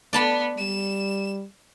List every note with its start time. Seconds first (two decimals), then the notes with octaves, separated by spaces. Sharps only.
0.13 B3 D5 A5 B5
0.58 G3 E7